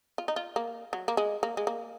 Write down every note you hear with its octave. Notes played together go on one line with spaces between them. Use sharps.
F4
D#4
F4
A#3
F#3
A#3
G#3
A#3
G#3
A#3